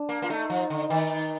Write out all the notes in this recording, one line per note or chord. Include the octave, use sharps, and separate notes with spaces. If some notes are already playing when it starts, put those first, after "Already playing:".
Already playing: D4
A#3
A#3 F4
A3 D#4
F3
D3
D#3